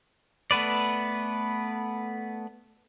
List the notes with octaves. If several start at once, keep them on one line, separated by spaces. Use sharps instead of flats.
A3 B3 B4 D5